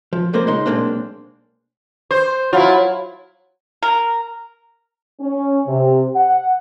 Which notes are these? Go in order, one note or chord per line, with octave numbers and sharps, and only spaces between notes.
F3
B1 F3 A#3 C4 A#4 C5
C#2 G#3 D#4 C6
B1 G#3 A#3 C4 D4
C5
F#3 E4 F4
A#4
C#4
C3
F#5